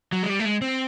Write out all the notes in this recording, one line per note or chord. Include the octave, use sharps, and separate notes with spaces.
F#3
G#3
G3
A3
G#3
C4